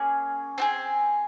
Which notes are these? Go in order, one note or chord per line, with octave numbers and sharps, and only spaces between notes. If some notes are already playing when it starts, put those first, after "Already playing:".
Already playing: A#3 C#4 G#4
C4 F4 G#4